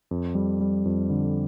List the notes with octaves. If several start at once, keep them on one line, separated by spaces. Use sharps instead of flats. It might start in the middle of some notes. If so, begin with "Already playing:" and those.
F2
G3
G3
F2
D3